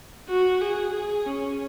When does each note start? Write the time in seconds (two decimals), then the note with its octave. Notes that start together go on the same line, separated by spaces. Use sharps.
0.29 F#4
0.61 G#4
0.94 G#4
1.26 C#4